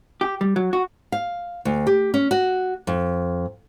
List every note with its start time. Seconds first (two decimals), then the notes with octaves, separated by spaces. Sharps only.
0.21 G4
0.41 G3
0.56 F#3
0.73 F#4
1.12 F5
1.65 D2
1.87 G4
2.14 C#4
2.31 F#4
2.87 F2